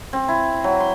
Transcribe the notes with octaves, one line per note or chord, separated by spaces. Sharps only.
C4
E4
F#3
C6